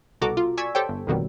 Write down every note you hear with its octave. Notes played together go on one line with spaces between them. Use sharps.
C2 B2 F#4 A4 A#5 D6
F4
D5 G#5 C#6 E6 G#6 B6
G4 A4 C5 C#5 G5
G1
A1 F2 B2 D#3 F#3 G3